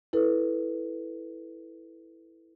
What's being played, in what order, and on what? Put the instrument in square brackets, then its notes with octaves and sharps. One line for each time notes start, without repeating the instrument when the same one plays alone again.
[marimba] E4 A4 B4